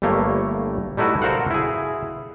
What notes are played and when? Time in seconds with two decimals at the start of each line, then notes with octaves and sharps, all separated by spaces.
0.02 G1 G2 A3 A#3 C#5
0.97 G3 A3 D#4 E4 F#4 B4
1.22 F#4 A4 A#4 C5 F5 F#5
1.51 E4 G#4